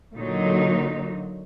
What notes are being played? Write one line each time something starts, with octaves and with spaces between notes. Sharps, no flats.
A#2 D3 F#3 D#4